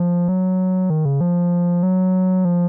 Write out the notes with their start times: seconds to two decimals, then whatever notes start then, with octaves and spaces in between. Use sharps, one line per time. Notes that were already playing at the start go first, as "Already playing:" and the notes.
Already playing: F3
0.28 F#3
0.90 D#3
1.05 C#3
1.21 F3
1.83 F#3
2.45 F3